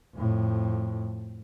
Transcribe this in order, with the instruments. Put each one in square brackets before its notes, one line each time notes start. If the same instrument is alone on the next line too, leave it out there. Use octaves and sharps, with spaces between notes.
[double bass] F2 A2